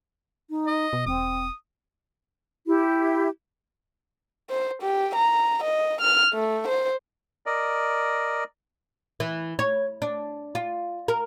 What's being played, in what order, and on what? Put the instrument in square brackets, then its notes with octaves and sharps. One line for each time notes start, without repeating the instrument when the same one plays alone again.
[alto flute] D#4
[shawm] D#5
[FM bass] B2
[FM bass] E1 [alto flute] C4 [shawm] D#6
[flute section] E4 G4
[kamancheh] C5
G4
A#5
D#5
F6
A3
C5
[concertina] A#4 D5 D#5
[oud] E3
C#5
D4
F4
A#4